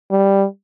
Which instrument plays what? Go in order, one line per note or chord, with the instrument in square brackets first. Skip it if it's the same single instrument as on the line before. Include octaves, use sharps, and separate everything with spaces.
[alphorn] G3